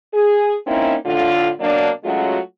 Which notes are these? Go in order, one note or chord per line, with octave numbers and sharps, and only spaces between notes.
G#4
A#3 C4 C#4 D#4 E4
A2 D3 F4
B2 F#3 A#3 D4
F#3 G#3 A3 C#4 F4 F#4